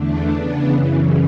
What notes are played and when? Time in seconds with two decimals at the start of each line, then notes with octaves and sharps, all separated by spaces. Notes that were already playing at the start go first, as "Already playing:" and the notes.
Already playing: E2 D3 A3 D4
0.28 C#3 E3 B3 D4
0.71 F#2 C#3 E3